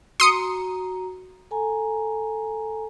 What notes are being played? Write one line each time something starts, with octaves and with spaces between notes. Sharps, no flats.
F#4 A#5 C6 D#6 C#7
A4 G#5 A#5